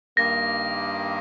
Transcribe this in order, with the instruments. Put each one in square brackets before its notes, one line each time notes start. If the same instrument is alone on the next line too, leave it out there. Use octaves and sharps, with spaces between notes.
[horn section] G2 D#3 A#3 [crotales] A#6